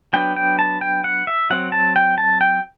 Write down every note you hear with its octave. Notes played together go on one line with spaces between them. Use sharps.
F#3 B3 D4 G5
G5
A5
G5
F#5
E5
F#3 C4 F#5
A5
G5
A5
G5